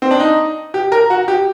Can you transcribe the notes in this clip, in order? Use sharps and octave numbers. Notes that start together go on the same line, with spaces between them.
C4
D4
D#4
G4
A#4
F#4
G4